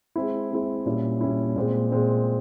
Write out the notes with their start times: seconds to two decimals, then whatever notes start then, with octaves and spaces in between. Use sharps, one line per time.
0.16 G#3 C4 E4
0.51 G#3 C4 E4
0.86 A#2 G3 C#4 E4
1.21 A#2 G3 C#4 E4
1.56 A#2 G#3 C4
1.92 A#2 G#3 C4